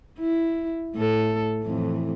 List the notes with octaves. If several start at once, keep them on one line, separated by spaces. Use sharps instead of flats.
E4
A2 A4
F2 A2 E3